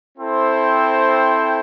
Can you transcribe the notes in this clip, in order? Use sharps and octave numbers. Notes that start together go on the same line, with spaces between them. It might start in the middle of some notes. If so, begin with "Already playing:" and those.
C4 E4 A4 C5 G5